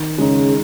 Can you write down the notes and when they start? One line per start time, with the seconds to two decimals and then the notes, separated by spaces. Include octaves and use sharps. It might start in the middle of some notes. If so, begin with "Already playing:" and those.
Already playing: D#3
0.18 C#3 G#3 D#4